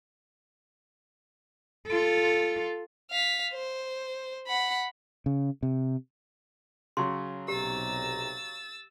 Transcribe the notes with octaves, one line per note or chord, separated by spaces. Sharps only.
F4 A4
F5 B6
C5
F#5 B5
C#3
C3
C#3 F#3 C6
B1 C3 G4 A#5 E6 A6